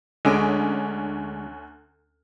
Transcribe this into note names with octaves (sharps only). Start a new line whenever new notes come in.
D2 D3 G#3 C#4 D7